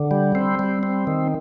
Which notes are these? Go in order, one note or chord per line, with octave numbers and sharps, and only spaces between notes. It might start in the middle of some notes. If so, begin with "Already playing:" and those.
Already playing: D3
G3
C4
G3
C4
D#3